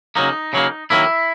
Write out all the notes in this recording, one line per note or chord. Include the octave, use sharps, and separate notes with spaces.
C#3 F#3 A#3 D#4
C#3 F#3 A#3
D#3 F#3 A#3 E4